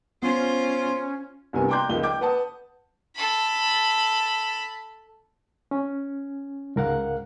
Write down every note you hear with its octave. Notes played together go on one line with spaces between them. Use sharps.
B3 C#4 F4 C5
C2 G2 C3 B3 A#4 G#5
G5 A#5 C6 D6 F#6 G6
C#2 D#3 F3 G7
G5 D6 G6
B4 F#5 A5 D#6
A4 B5
C#4
C#2 G#2 A#4 F5 F#5 F#6